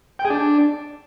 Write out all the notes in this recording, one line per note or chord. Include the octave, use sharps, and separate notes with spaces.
G5
G#4
D4